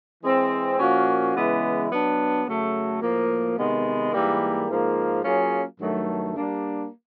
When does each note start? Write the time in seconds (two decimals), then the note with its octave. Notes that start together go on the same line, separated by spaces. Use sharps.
0.23 E3 G#3 C4
0.79 A#2 F3 A#3 C#4 F#4
1.35 C#3 E3 G#3 B3 E4
1.90 F#3 B3 D4
2.47 C#3 F#3 A3
3.02 A2 F3 A#3
3.58 C3 D#3 G#3 B3
4.13 G#2 E3 G3 A#3
4.69 G#2 F3 A#3
5.24 F#3 A#3 C#4 F4 G#4
5.80 G2 D#3 F#3 A3
6.36 G3 A#3 D4